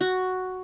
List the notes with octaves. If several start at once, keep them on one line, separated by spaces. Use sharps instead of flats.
F#4